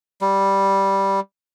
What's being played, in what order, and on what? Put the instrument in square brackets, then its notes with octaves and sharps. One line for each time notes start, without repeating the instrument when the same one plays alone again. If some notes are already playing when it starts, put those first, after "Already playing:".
[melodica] G3